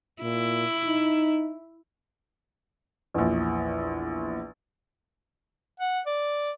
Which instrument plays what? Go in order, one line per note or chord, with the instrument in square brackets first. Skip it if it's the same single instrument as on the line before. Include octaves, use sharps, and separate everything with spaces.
[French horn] A#2 [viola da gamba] E4
[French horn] D#4
[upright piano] A#1 E2
[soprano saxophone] F#5
D5